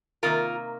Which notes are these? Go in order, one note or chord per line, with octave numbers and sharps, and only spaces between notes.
C3 D#3 A#3 F4 A#4